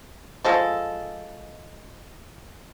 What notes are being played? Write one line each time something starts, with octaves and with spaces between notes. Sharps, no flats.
F3 G#3 A4